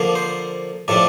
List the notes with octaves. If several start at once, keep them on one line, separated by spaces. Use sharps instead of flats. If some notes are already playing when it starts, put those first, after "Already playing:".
Already playing: D3 F3 A#3 D4
C5
A2 F3 A3 D4 D5